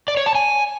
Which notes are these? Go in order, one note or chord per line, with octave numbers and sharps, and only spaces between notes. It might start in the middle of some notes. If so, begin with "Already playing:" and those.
D5
C#5
A5
G#5